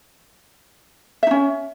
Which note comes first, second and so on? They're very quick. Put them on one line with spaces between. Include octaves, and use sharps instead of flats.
E5 D#4 C#4